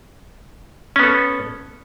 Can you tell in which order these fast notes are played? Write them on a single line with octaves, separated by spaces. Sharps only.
C#4 B3 A4